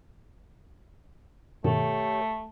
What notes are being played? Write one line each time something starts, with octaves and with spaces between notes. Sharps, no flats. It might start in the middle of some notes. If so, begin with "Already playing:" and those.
G2 B2 D#3 A3 G4 A4 C#5